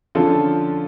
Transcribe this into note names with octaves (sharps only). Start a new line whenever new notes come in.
D3 F3 C#4 F4 A4